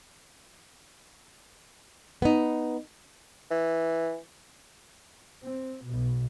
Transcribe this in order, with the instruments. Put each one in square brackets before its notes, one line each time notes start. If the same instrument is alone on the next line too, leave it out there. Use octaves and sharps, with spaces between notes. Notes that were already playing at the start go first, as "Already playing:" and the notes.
[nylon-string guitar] B3 D#4
[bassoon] E3
[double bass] C4
B1 B2